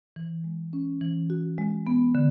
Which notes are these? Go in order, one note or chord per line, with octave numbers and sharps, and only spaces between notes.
E3
G#3
C#4
E3
F#4
G#3
B3
D3